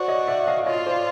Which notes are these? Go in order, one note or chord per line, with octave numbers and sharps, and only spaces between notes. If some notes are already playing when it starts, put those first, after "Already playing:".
Already playing: F#4 C5 D5
C#5 D#5
D5 E5
D#5 F5
F4 C#5 D#5
C5 D5